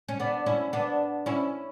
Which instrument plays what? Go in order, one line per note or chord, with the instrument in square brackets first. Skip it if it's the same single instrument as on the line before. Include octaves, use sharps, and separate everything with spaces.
[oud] C#4
B3 D4
C#4 E4
B3 D4
C#4 E4